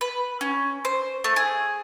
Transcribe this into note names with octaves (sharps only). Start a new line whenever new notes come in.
B4
C#4
C5
A3
G#4